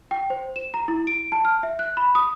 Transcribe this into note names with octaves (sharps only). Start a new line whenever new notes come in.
G5
C5
E7
A#5
E4
D7
A5
F6
E5
F#6
B5
D#6